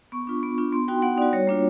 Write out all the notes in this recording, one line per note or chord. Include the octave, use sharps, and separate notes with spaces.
B3 C#6
D4 F4
B3
D4 F4
B3 C6
D#4 F#4 G5
B3 F#5
D#4 F#4 D5
G3 C#5
A#3 D4 F4